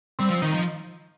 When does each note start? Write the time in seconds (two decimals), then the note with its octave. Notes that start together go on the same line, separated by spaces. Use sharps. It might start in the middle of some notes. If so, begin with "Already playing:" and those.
0.19 G3 C4
0.30 F3
0.42 D#3 D#4
0.54 F3